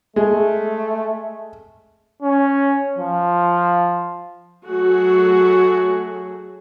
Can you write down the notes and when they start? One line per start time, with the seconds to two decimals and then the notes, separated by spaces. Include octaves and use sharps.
0.16 G#3 A3
2.22 C#4
2.99 F3
4.66 F#3 A3 F#4 G#4